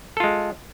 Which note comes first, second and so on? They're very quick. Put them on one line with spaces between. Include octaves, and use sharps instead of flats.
A4 F4 G#3